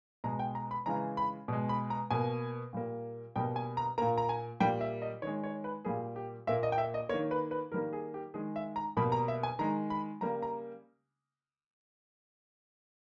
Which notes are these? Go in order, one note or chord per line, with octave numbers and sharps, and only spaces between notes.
B2 G#3 A#5
G5
A#5
B5
C#3 E3 G#3 A#5
B5
B2 G#3
B5
A#5
B2 A#3 G#5
A#2 G3 A#3
B2 G3 A#3 G5
G#5
A#5
A#2 A#3 A#5
A#5
G#5
A#2 G3 A#3 G5
E5
D#5
D#3 G#3 C#5
C#5
B4
A#2 G3 A#3 G#4
G4
A#2 A#3 E5
D#5
G5
E5
D#5
D#3 A#3 C#5
B4
B4
D#3 G3 A#3 A#4
G#4
G4
D#3 G#3 G#4
E5
A#5
B2 G3 A#3 B5
A#5
E5
G#5
D#3 G#3 A#5
B5
C#3 G3 A#3 A#5
A#5